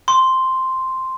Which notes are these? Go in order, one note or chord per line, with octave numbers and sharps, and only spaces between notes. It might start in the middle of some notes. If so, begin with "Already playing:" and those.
C6